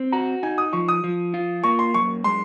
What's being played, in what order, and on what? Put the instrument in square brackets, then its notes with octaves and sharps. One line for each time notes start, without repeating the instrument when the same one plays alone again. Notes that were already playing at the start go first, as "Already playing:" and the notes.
Already playing: [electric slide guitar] C4
[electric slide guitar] F#4 [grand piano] A#5
[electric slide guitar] D#4 [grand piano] G#5
[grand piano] D#6
[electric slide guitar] F3 [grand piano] C#6
[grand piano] D#6
[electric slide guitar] F3
F4
[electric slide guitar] A#3 [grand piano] C#6
[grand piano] C6
[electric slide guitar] F#2 [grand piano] C#6
[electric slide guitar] G#3 [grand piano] C6